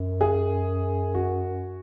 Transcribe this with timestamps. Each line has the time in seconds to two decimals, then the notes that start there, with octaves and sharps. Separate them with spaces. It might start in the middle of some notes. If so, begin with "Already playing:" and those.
Already playing: F#2
0.21 G#4
1.14 F#4